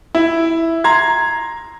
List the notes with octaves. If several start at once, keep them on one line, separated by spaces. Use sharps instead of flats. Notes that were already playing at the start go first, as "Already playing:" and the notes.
E4
A#5 C6 G#6